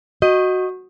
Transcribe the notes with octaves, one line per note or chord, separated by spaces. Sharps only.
F#4 D#5